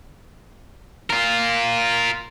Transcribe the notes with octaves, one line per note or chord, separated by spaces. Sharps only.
F4 A#4